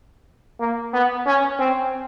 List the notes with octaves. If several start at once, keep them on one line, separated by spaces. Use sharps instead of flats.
A#3
B3
C#4
C4